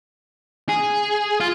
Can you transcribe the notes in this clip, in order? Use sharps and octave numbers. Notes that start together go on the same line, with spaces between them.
G#4
F4